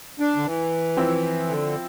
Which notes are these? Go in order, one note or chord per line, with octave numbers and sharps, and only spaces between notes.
D4
D3
E3
F3 C4 E4
D3